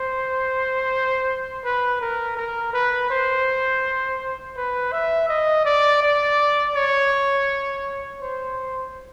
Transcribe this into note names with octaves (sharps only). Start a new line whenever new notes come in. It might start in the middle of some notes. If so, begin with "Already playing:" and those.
Already playing: C5
B4
A#4
A#4
B4
C5
B4
E5
D#5
D5
D5
C#5
C5